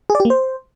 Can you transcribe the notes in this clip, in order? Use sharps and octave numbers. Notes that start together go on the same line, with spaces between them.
G#4
D5
G4
A#3
C5